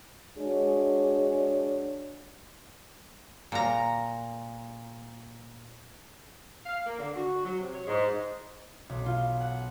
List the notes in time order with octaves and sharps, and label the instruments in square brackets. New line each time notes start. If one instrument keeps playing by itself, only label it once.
[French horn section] G#3 D4 F#4 G#4 C#5
[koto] A#2 A#5
[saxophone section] F5
A#3
D3
F#4
F#3
C3
C#5
G#2
[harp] B1
F4
F#5